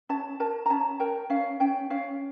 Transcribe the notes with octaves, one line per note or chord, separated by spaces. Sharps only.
C#4 A5
A#4 A5
A#5
C#4 A5
A#4 G5
C#4 F5
C#4 G5
C#4 F5